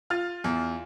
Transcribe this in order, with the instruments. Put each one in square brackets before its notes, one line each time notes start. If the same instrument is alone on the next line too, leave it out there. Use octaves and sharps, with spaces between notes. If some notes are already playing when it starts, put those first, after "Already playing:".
[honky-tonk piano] F4 F6 A6
[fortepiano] E2